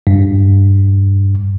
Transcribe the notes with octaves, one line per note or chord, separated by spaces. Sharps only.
G2